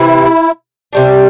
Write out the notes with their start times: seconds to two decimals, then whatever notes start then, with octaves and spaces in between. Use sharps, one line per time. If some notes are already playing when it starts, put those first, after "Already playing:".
Already playing: C3 E3 E4
0.93 C3 G3 D4